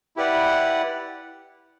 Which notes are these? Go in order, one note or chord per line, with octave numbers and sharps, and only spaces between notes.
E4 G4 B4 D5 F#5